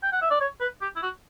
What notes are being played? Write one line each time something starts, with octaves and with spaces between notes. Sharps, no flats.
G5
F#5
E5
D5
C#5
B4
G4
E4
F#4